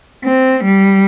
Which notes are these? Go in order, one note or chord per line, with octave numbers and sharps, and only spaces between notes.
C4
G3